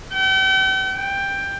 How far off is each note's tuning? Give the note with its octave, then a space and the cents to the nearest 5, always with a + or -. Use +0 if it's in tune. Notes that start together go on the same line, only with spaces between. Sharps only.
G5 -45
G5 +10